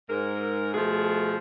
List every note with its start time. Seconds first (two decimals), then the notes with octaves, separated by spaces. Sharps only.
0.10 G#2 A#4
0.74 B2 F3 A3 G#4